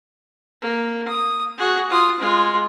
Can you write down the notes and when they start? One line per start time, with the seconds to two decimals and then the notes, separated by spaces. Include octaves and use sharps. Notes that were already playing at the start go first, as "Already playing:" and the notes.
0.62 A#3
1.07 D#6
1.58 F#4 G#4
1.89 F4 D#6
2.20 G#3 F4